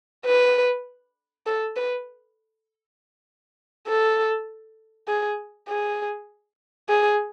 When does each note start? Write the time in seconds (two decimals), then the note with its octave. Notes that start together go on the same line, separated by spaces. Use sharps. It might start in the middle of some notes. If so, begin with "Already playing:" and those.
0.26 B4
1.46 A4
1.76 B4
3.88 A4
5.08 G#4
5.68 G#4
6.89 G#4